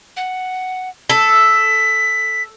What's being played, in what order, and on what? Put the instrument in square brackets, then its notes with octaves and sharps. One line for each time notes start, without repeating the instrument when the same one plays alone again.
[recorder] F#5
[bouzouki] A4 [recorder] B6